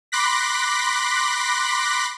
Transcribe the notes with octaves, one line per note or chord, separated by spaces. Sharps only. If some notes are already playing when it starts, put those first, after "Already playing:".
B5 C6 D6 F#6 A#6 B6